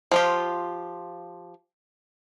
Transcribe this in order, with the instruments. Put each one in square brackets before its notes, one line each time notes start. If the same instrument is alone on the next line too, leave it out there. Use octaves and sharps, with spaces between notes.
[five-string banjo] F3 F4 G4